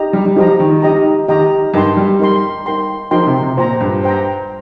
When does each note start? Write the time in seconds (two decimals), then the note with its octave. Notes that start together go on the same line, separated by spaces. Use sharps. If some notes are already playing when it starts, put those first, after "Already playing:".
Already playing: D#4 G4 D#5 G5 A#5
0.13 G3
0.26 G3
0.36 F3 D#4 G4 D#5 G5 A#5
0.60 D#3
0.82 D#4 G4 D#5 G5 A#5
1.28 D#3 D#4 G4 D#5 G5 A#5
1.74 G2 D#4 A#4 G5 C6
1.97 G3
2.19 D#4 A#4 G5 C6
2.66 D#4 A#4 G5 C6
3.11 F3 D#4 A#4 G5 C6
3.27 C3
3.42 C3
3.57 A#2 C5 G5 A#5
3.81 G2
4.03 C5 G5 A#5